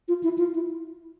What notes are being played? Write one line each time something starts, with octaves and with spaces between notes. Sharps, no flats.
F4
E4
F4
E4